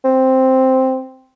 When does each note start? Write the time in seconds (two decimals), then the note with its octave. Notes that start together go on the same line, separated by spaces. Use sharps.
0.04 C4